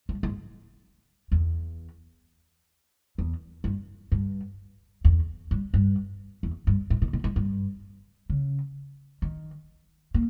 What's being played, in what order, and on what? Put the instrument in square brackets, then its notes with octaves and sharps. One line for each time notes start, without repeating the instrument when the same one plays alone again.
[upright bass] G2
G#2
E2
E2
G2
G2
E2
G2
G2
E2
G2
G#2
B2
B2
G#2
G2
C#3
D#3
A#3